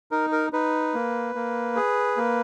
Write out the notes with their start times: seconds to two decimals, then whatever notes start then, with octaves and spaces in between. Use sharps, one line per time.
0.11 D#4 A#4
0.32 A#4
0.53 D#4 B4
0.94 A#3
1.35 A#3
1.76 G#4
2.17 A#3